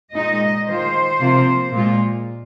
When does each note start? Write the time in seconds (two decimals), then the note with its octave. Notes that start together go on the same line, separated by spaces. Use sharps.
0.14 A#2 G#3 D#4 D#5
0.68 D#3 G#3 F4 C5
1.20 C3 F3 A#3 F4
1.73 A#2 G#3 F4